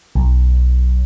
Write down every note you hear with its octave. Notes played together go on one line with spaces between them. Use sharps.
B1